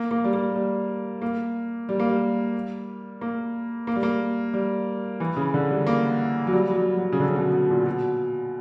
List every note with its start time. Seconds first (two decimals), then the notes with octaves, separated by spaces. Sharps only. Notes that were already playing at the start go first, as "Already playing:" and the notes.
Already playing: A#3
0.11 A#3
0.24 G3
0.33 A#3
0.56 G3
1.22 A#3
1.89 G3
1.99 A#3
2.09 G3
3.21 A#3
3.87 A#3
3.96 G3
4.03 A#3
4.53 G3
5.20 E3
5.36 C#3
5.54 D3
5.71 G3
5.87 A#3
6.47 F#3
6.53 G3
6.70 F#3
6.76 G3
6.97 F#3
7.12 C#3
7.20 D3
7.28 C#3
7.36 B2
7.52 B2
7.70 A#2
7.86 B2